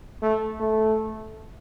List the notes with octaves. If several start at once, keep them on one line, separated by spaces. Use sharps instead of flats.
A3
A3